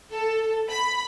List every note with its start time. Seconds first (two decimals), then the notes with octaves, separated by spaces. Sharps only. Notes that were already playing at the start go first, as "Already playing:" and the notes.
0.12 A4
0.69 B5